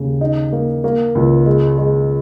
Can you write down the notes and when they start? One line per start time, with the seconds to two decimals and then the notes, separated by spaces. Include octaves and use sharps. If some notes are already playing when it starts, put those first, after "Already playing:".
Already playing: D#2 C#3
0.21 D#4
0.52 A#3
0.84 A#3
1.15 C#2
1.46 G#3
1.78 G#3